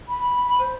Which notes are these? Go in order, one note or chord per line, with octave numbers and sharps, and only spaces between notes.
B5
C5